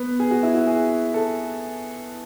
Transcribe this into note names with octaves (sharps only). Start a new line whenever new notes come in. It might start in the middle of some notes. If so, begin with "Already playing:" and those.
Already playing: B3
G#4
F#4
E4
F#4
G#4
A4